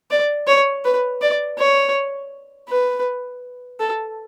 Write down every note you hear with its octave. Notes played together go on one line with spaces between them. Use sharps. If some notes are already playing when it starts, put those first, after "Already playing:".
D5
C#5
B4
D5
C#5
B4
A4